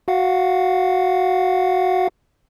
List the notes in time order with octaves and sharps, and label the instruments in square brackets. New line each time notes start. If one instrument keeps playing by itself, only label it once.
[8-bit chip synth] F#4 F5 F#5